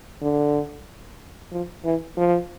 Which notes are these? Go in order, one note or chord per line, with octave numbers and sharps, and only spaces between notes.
D3
F3
E3
F3